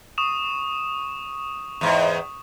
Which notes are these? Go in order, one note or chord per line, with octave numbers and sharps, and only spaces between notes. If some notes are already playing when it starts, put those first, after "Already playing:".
C#6 D#6 E7
E2 G#2